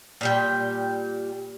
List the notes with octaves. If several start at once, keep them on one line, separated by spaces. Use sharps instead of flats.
A#2 G3 G5